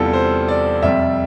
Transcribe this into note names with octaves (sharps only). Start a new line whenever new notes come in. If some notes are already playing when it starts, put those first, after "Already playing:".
Already playing: E2 C3 E3 G3 F4 A4
C5
D5
F2 C3 G3 E5